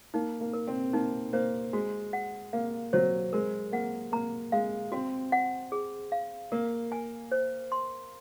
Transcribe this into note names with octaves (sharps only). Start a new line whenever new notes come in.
A#3 D#4
A#3
A#4
C4
A#3 D#4
A#3 C5
G#3 F#4
F#5
A#3 F5
F#3 C5
G#3 A#4
A#3 F#5
A#3 A#5
G#3 F5
C4 F#4
F#5
G#4
F5
A#3 A#4
G#5
C5
C6